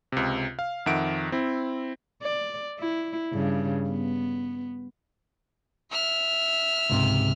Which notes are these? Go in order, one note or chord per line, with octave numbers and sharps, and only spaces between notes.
C#2 C3
F5
F2 D#3 E5 F#5 D7
C4 E4
D5
E4
G2 C#3
B3
E5 F6
C#2 G#2 C3